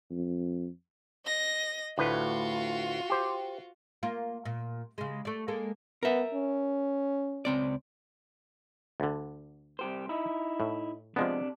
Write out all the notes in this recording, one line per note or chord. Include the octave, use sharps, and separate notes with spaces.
F2
D#5 A#6
D2 A2 F4 F#4 B4
G4 C5
A#3 F4
A#2
C#3 G#3
A3 D5
G#3 A#3 A4
B3 A#4 E5
C#4
C#2 C4 D5
D2 D3
C2 G4 C5
D#4 E4
A2
C3 F3 G#3 B3 D4